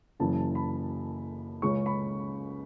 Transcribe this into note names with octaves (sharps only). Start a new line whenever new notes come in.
F#1 F#2 C#3 E3 A5
B5
C#2 C#3 G#3 C#4 C#6
B5